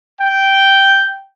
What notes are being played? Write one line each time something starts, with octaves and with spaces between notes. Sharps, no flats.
G5